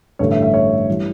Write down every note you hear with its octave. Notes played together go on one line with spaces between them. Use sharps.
A1 G2 D3 A3 C#5
E5
E5
C#5
E3 G3